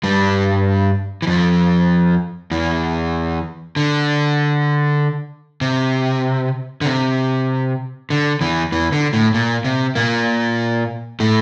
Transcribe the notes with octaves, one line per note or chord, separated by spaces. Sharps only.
G2 G3
E3
F2 F3
E2 E3
D3
C3
D3
C3
D3
E2 E3
E2 E3
D3
A2
A#2
C3
A#2 A#3
A2 A3